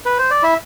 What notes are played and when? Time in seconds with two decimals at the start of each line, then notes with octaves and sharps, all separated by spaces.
0.05 B4
0.18 C5
0.31 D5
0.43 E4 E5